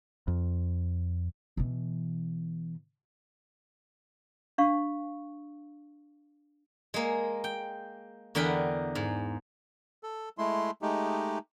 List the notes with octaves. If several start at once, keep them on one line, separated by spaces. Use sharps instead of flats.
F2
B2 E3
D4 F5 C#6
G#3 A#3
G5
E2 D3 A#4 F#5 G5 B5
G#2
A4
G#3 A3 E4 C6
G#3 A3 D#4 G4